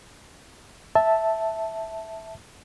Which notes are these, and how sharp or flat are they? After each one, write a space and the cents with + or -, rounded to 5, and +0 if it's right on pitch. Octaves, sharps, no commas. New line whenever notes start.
E5 -5 A5 +0